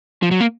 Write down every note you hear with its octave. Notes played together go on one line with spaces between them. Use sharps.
F3
F#3
A#3